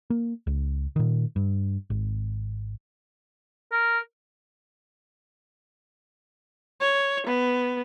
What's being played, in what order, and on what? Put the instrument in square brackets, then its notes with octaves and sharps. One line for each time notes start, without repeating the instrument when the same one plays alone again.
[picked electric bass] A#3
C#2
A#2 D#3
G2
G#1
[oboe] A#4
[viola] C#5
B3